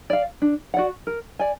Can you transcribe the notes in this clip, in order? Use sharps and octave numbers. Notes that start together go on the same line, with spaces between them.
D5 F5
D4
F#4 D5 F#5
A#4
D5 G#5